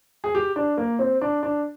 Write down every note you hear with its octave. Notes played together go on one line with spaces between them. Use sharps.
G#4
G4
D4
A#3
C4
D4
D4